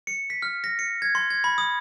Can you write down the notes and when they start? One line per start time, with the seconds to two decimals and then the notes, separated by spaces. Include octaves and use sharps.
0.07 C#7
0.30 B6
0.42 F6
0.64 A#6
0.79 C#7
1.02 G#6
1.15 C6
1.30 G#6
1.44 B5
1.58 D#6